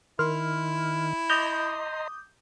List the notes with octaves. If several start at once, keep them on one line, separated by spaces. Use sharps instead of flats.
D#3 E4 C6 F6
D#5 A#5 C6 D6 D#6 G6